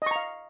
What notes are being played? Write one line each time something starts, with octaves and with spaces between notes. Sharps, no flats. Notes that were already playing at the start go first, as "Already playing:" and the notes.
D#5 F5 A#5 C#6